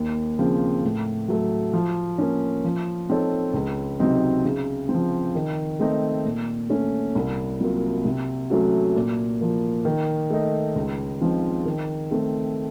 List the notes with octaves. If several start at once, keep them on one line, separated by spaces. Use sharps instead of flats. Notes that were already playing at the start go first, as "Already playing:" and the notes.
Already playing: D#2
C#3 F3 C4
A2
F#3 A3
F3
A#3 C#4
F3
C4 D#4 A4 C#5
C#2
C3 F#3 C4 D#4
C#3
C4
F3
D#3
A3 C4 D#4
A#2
A3 C#4
C2
C3 F#3 A#3 F4
C3
F#3 A3 C#4 F#4
A#2
F3 A#3
D#3
A3 D#4
C#2
C#3 F3 C4 D#4
D#3
A3 C4